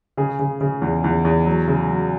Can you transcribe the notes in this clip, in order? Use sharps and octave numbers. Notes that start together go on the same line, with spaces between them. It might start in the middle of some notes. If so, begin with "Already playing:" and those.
C#3 G#4
C#3
C#3
E2
E2
E2
F#3
C#3
F#3